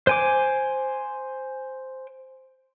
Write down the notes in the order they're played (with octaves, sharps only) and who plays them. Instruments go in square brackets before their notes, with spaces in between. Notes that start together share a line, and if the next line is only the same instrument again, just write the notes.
[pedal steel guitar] C5 G#5 D6